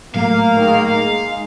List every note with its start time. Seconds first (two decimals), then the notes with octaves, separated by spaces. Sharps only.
0.14 A2 F#3 A3 A#3 F5
0.57 D#3 G#3
0.93 G#3 D#4